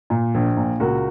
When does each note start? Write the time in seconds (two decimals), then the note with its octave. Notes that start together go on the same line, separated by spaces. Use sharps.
0.10 A#2
0.34 A#1
0.57 A#2
0.80 C#2 F#4 A#4